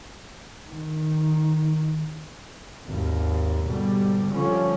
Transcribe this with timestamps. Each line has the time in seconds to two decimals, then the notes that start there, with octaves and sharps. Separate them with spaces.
0.69 D#3
2.86 G#1 D#2
3.64 G#2 B2 D3 G3
4.29 D3 F3 G3 C#4